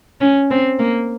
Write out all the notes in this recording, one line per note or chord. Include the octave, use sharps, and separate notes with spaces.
C#4
C4
A#3